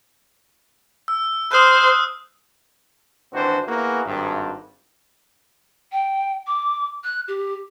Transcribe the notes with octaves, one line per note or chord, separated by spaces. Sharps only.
E6
C5 D#6 F6 F#6
G#1 E3 C4 D4 F#4 C5
A#3 B3 E4 F#4 G#4
G#1 G2
G5
D6
F#6
G4